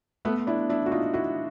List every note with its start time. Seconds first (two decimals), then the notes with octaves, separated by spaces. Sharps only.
0.25 A3 B3
0.47 D4 E4
0.69 D4 E4
0.86 F#4
0.92 D#4 F4
1.13 E4 F#4